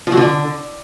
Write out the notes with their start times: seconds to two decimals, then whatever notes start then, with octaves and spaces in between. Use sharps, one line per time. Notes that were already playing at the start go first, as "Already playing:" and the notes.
0.07 F3
0.12 F#3
0.17 D3